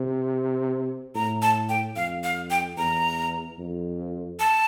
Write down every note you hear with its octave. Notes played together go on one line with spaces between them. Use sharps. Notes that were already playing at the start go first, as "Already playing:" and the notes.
Already playing: C3
A2 A#5
A5
G5
F2 F5
F5
G5
E2 A#5
F2
A5